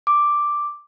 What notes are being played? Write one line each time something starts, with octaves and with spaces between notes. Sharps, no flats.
D6